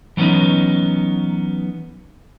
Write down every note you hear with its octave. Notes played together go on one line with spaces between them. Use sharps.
E3 F#3 B3 C#4 D#4